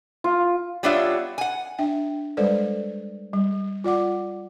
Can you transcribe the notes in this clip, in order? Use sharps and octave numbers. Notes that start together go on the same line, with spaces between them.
F4
G3 B3 D4 F4 C#5 E5
F#5 G#5
D4 E5 G5
G3 G#3 A4 B4 C5 D5
G3
F4 D5 F#5 D6